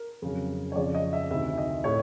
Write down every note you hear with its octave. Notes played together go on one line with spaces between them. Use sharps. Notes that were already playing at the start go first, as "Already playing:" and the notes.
Already playing: A#4
F2 C#3 F#3
C#5
F2 C#3 F3 D5
D#5
E5
D2 C3 D#3 E5
D#5
A2 C#5